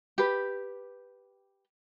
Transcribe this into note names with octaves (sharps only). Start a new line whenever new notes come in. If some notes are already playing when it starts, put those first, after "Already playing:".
G4 B4